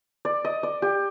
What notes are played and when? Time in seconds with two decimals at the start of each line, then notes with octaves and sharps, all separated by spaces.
0.25 D5
0.45 D#5
0.63 D5
0.82 G4